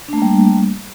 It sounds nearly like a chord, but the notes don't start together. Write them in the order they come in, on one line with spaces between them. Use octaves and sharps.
D4 A3 A#3 G3